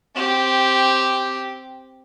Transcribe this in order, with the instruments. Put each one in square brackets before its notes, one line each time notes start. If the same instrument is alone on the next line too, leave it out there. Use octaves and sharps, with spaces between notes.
[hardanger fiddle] C4 G4